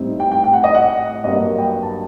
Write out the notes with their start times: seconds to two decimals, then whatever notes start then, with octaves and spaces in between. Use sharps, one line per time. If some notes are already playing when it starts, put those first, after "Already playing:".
Already playing: A2 G3 C4 D#4
0.20 G5
0.32 G5
0.44 G5
0.53 F#5
0.64 D#5
0.75 F#5
1.24 G2 F#3 A#3 D#5
1.58 G5
1.83 A5